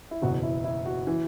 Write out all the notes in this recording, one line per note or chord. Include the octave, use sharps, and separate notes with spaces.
E4
F#1 E2 B2 F#4
E4
E4
F#4
E3